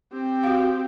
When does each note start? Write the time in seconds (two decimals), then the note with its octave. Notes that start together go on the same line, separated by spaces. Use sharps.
0.13 C4 G4
0.43 F#4 F5